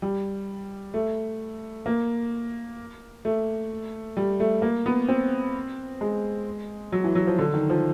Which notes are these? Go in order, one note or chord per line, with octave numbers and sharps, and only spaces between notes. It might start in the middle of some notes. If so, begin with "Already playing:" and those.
G3
A3
A#3
A3
G3
A3
A#3
B3
C4
G#3
F#3
E3
F#3
F3
D3
D#3
F3